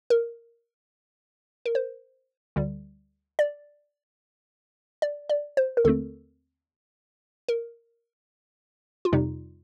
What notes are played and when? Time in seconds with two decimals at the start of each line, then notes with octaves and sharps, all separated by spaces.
0.10 A#4
1.66 A#4
1.75 C5
2.56 D2 D3 G3
3.39 D5
5.02 D5
5.29 D5
5.57 C5
5.77 A#4
5.84 D#2 D3 A3 C4 A4
7.48 A#4
9.05 F4
9.12 F2 C3 G3 D#4